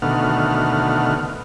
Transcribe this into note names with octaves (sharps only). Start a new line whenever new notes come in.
D2 B2 D#3 A3 F#5 F6